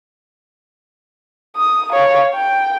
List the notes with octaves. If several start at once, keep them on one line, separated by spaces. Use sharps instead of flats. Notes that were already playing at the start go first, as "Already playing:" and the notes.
D#6
C#5 F5
G5